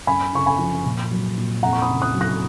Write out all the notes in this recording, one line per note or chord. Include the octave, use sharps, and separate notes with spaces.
F#2 G#5 B5
C#3 C#6
G#5 B5
F3
A#2
F#3
A#2
F2 F#5 A#5
C#6
B5 D#6
C#3
D#6 F#6
F#3
F#6 A#6